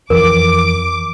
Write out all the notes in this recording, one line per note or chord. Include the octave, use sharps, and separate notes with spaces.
F2 E3 A#4 D6